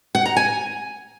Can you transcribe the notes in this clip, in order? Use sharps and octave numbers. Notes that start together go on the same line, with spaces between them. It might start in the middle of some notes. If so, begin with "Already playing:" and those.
F#5
A#5
G#5